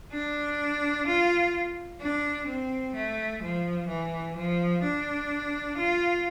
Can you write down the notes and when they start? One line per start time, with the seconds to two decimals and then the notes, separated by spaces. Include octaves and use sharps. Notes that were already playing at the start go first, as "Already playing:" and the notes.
0.12 D4
1.06 F4
2.01 D4
2.47 C4
2.94 A3
3.42 F3
3.89 E3
4.36 F3
4.83 D4
5.77 F4